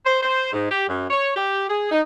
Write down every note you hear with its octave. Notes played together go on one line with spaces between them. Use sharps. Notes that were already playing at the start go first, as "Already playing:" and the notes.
C5
C5
G#2
G4
F#2
C#5
G4
G#4
D#4